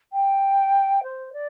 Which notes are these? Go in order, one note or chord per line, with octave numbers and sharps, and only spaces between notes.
G5
C5
D5